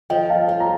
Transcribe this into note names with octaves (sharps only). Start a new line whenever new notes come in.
F3 D#5 G5
F5 A5
F4
A#5